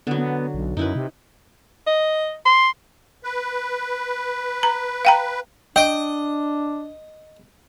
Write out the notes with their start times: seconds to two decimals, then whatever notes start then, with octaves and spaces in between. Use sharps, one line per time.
0.07 D3 F#3 B3
0.18 B3
0.54 B1
0.77 F#2 D#4 E4 B4
0.95 C3
1.87 D#5
2.45 C6
3.24 B4
4.63 A#5
5.05 F5 G5 A#5
5.76 D4 D#5 G5